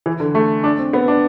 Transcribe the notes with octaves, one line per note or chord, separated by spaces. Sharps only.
E3
D3
A3
D4
C4
B3
D4